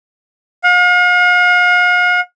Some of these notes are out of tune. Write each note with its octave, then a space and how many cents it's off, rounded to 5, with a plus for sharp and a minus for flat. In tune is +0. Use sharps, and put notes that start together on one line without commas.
F5 +45